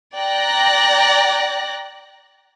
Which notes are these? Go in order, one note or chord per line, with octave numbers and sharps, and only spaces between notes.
D5 G5 A#5 F#6 A#6